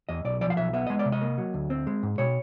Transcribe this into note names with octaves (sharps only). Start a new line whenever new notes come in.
E2 D#5
B1 D5
F3 D5
F5
B1 E5
B3 E5
G#3 D#5
D5
C3
D#5
A#3
F#3
D2
C4
G#3
G#2
B2 C#5